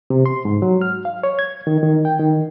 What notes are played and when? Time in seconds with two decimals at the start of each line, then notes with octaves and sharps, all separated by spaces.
0.10 C3
0.26 C6
0.45 G#2
0.62 F#3
0.81 F6
1.05 F5
1.23 C#5
1.39 G#6
1.67 D#3
1.83 D#3
2.05 G5
2.19 D#3